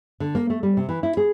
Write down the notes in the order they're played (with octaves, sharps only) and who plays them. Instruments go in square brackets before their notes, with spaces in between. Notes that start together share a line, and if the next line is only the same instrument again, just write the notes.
[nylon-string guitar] D3
A#3
A3
G3
C3
E3
E4
G#4